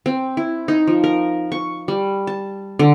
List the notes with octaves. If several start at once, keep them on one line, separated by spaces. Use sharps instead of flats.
C4
E4
D#4
F3
A#4
C#6
G3
A5
D3